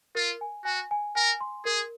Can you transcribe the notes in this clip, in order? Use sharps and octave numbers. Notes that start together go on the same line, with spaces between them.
F4 A#4
G#5
F#4 G#5
G#5
A#4 G#5
C6
G#4 A#4